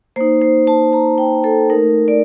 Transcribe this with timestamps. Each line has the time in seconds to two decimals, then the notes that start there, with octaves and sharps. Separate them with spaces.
0.16 A#3 D#4 C5
0.41 C5
0.67 A5
0.93 A#5
1.18 G5
1.44 A4
1.70 A3 D#4 A#4
2.08 D5